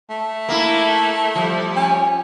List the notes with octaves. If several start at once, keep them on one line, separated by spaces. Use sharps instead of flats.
A3
A#3 E4
F3 G3
C#4